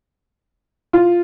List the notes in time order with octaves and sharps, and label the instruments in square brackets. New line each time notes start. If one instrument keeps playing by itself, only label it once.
[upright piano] F4